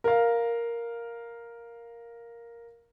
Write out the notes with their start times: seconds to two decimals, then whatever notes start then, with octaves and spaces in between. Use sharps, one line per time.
0.04 A#4 F5